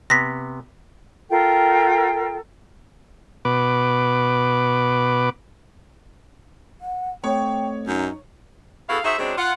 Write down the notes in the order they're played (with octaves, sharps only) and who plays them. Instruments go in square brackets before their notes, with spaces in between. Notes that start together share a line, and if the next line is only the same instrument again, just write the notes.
[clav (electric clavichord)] C3 B3 [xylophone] A#6 B6
[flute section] F4 A4 A#4 G5
[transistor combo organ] B2 B4 D6
[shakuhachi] F#5
[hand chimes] A3 C4 [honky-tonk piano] C#5 [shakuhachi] G5
[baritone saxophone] F#2 [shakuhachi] D#4
[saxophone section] B3 E4 F#4 G#4 A4 F5
D#4 F#4 G#4 C5 E5
C#3 F#3 G#3 C4 D4
F4 F#5